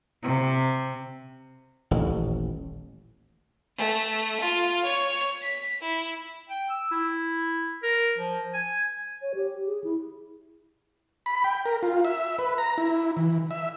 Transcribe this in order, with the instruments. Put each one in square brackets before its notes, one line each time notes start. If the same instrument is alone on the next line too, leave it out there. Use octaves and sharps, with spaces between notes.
[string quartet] C3
[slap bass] D#1 A1
[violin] A3
F4
C#5
B6
E4
[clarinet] G5
E6
E4
A#4
F3
G#5
[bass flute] C#5
G4
G#4
E4
[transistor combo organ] B5
G5
A#4
F4
E5
B4
A#5
E4
E3
E5